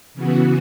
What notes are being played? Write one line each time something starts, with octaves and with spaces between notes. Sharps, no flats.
C#3 E3 B3 F#4